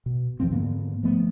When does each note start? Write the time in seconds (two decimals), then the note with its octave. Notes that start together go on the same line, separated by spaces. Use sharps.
0.06 B2
0.40 F2 E3 F3 C4
0.51 G#2 D3 A#3 B3
1.03 F3 A3 B3